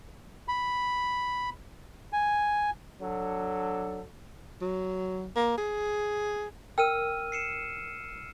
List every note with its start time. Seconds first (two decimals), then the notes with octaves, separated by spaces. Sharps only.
0.48 B5
2.13 G#5
3.01 F#3 D4 A4
4.61 F#3
5.35 A#3
5.58 G#4
6.78 A#4 G5 E6 F6 D#7
7.32 C7 C#7 E7